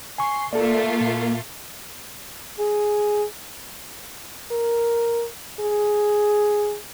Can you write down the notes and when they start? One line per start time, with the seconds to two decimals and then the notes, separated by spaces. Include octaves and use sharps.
0.18 G#5 C6 C#6
0.53 A3 A#3 F4 A4 D5
1.01 A#2
2.59 G#4
4.51 A#4
5.60 G#4